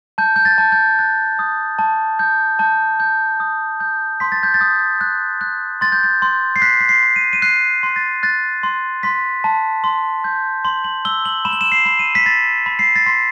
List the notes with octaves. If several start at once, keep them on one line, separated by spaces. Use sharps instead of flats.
A5 G6
G6
A6
A5
G6
F#6 A6
D#6
A5
G6
A5 G6
G6
D#6
G6
C6 B6
A6
G6
A6
D#6
F#6
F#6
C6 A6
G6
A6
C6
C7
F#6 B6
B6
C7
C6
D#7
D#7
F#6 C7
C6
A6
F#6 A6
C6
C6 B6
A5
C6
G6
C6 F#7
F#7
E6 G7
F#7
B5 E7
F#7
E7
C7
B5
D#7
B6
B5 A6
B5
C7
A6
C6 B6